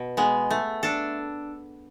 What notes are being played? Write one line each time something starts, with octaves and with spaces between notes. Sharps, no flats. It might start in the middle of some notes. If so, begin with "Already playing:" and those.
Already playing: B2
G#3 B3
A3
D4 A4